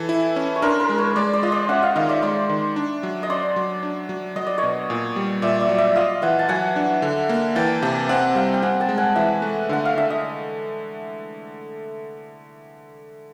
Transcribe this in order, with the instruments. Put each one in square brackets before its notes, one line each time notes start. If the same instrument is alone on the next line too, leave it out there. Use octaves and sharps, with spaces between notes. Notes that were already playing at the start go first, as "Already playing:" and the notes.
Already playing: [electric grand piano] E3 [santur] A4
[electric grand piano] E4
C#4
[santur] C#5
[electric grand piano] D4 [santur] A#4 C5
[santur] A#4 C5
[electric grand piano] G#3
[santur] B4 C#5
[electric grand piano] G#3 [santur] C5 D5
[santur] C5 D5
[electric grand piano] F4 [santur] D#5
[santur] C5 D5
[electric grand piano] C#4 [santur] E5 F#5
[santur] D#5 F5
[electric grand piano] D#3 [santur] D#5 F5
[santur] D5 E5
[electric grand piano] G#3 [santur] C5 D5
[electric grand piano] D#3
D4
F#3
[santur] D#5
[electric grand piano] C#4 [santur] C5 D5
[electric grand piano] F#3
D4
F#3
[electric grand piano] F#3 [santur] D#5
[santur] D5
[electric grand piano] B2 [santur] C#5 D#5
[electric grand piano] A#2
G3
[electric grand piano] A#2 [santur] D5 E5
[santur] D5 E5
[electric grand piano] F#3
[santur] D5 E5
[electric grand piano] F4 [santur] D#5 F5
[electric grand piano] E3 [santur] E5 F#5
[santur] A5
[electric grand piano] F#3 [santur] F#5 G#5
[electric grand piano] D4
D3
A#3
[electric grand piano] E3 [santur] G5 A5
[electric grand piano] C3 [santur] G5 A5
[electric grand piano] C4 [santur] F#5 G#5
[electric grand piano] G3 [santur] F5 G5
[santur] G5
[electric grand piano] C4 [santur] F#5 G#5
[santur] G5 A5
[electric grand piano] G#3
[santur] F#5 G#5
[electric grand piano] E3 [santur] E5 F#5
[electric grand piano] A3
[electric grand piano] D3 [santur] F#5
[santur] F5
[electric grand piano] D3 [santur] E5
[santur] D#5